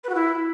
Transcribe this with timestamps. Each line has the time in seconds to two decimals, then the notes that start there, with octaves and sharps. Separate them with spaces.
0.03 B4
0.09 F#4
0.14 E4